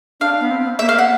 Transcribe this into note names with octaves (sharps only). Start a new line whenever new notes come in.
D4 F5
B3
C4
B3
A#3 E5
F5
F#5